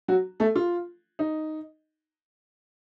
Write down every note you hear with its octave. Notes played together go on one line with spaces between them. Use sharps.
F#3 F#4
A3 A4
F4
D#4